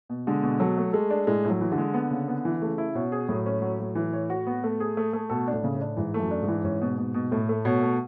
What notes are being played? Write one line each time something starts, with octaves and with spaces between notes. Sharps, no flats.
B2
D3 G#3
B2
F#3 A4
A3
G#3 A4
D4
A2 G#3
A2
F#3
E3
D3
G#3
B3
C#3
B3
E3
C#3 A3
E4
B2 C#4
G#4
A2 F#3
C#4
F#3
F#3
E3
C#5
F#4
B3
A3
G#4
A3
A3
B2 A4
D4
A2
C#3
A2
D4
G#2 E3
A3
F#2
D4
G#2
E3
G#2 C#4
B2
B2
B2
A2 A3
A3
B2 C#5
A3